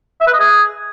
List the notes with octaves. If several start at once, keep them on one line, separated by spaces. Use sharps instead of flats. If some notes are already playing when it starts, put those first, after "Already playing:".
E5
B4
D#5
G#4